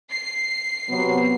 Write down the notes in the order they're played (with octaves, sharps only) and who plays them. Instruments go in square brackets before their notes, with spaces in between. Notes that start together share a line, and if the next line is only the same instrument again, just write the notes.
[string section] C7
[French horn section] C3 F#3 B3